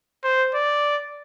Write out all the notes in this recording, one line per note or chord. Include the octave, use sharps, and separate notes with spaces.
C5
D5